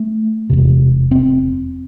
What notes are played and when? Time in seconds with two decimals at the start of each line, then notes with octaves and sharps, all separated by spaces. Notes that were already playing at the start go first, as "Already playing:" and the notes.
Already playing: A3
0.50 E1 E2 C3
1.11 C4